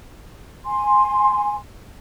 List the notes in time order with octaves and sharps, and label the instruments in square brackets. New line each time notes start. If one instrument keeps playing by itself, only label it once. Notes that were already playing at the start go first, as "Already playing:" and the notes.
[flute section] G#5 C6